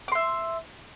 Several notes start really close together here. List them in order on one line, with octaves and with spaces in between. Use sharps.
D6 C6 E5